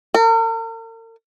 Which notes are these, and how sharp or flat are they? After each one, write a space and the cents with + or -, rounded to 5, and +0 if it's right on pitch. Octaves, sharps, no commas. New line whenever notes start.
A#4 -45